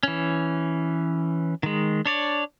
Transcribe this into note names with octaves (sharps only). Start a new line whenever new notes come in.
E3 C#4
D#3 G#3
D4 C#5 D5